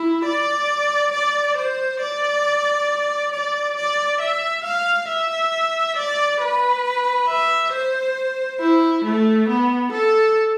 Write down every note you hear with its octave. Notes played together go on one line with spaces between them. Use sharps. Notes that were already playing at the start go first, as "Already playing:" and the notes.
Already playing: E4
D5
D5
C5
D5
D5
D5
E5
F5
E5
D5
B4
E5
C5
E4
A3
B3
A4